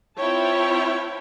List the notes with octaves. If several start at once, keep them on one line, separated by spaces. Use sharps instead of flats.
C4 E4 F4 C#5 G5 A5